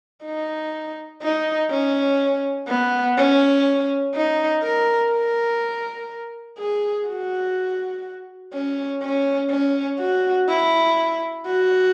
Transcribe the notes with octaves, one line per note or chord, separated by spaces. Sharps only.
D#4
D#4
C#4
B3
C#4
D#4
A#4
A#4
G#4
F#4
C#4
C#4
C#4
F#4
E4
F#4